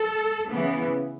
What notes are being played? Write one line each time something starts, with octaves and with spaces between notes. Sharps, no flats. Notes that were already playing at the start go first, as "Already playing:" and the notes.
Already playing: A4
C#3 E3 B3